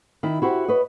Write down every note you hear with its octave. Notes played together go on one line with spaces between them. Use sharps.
D#3 E4
E4 F#4 G4 C5
B4 C#5 D#5